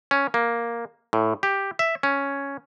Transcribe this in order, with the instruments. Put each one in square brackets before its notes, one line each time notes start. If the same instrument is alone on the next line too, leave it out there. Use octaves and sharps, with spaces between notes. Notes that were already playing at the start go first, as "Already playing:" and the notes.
[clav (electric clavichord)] C#4
A#3
A2
G4
E5
C#4